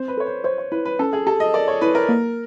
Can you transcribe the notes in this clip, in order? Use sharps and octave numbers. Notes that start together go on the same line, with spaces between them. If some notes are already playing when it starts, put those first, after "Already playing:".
Already playing: C4 C5
B4
A4 C#5
C5
C5 C#5
C#5
E4 B4
B4
C#4 A4
G#4
G4 A4
D#5
A#4 D5
C#5
E4 B4
A#4
A#3